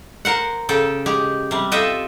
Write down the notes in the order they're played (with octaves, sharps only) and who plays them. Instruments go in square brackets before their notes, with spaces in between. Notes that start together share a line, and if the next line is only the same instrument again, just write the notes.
[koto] A#4 C5 F#5
C#3 A4 G5
G#3 G4
C3 G3
F4 A4 D#5 E5 G5